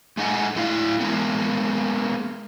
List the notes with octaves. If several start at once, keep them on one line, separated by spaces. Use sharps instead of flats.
G#3 A3 D#4 E5 F#5 G#5
A3 E4 F5
G#3 A#3 B3